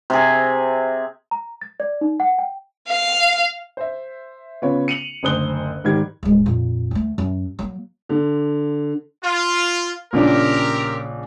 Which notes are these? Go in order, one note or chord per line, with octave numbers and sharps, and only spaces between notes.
C3 G#4
A#5
A6
D5
D#4
F#5
G5
F5
C5 E5
C#3 B3 F4 C#5
C#7 D#7 F7 F#7
F#1 D2 C5 D#6 F#6 G7
G#2 D#3 G3 G#6
D1 G#3
F2 A#2
D2 A3
F#2
F#3 A#3
D3
F4
A#1 C#3 C4 D4 G4 A#4